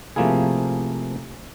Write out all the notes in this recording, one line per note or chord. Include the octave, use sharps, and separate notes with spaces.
C3 F3 A3 A#3 E4 G#4